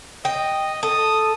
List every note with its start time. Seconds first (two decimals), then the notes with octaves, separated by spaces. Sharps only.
0.25 D#5 G5
0.83 A4 D#6